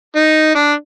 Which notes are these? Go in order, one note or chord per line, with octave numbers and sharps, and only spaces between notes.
D#4
D4